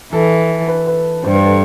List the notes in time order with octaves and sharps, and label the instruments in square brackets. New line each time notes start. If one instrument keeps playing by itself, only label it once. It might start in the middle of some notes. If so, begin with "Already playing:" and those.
[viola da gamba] E3 [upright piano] A4
[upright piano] B4
B4
[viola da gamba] G2 [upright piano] C5
[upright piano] B4
A4